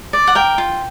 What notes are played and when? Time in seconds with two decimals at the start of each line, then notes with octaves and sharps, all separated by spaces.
0.13 D5
0.27 F#5
0.35 A#4 G5
0.58 F4